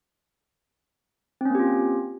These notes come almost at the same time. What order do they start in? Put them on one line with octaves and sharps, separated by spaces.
C4 C#4 A#3 G4 F4